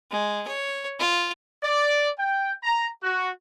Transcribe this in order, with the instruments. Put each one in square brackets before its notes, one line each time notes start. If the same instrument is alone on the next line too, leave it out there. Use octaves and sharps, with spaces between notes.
[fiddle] G#3
C#5
F4
[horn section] D5
G5
A#5
F#4